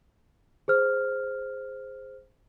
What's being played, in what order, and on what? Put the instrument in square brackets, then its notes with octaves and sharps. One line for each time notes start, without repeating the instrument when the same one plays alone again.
[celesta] G#4 C5 F6